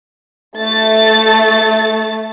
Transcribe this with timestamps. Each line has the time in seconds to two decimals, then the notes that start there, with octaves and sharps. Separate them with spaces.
0.58 A3 A6